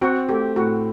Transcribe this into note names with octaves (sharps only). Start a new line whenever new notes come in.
C4 F#4
A3 G4
A2 F#4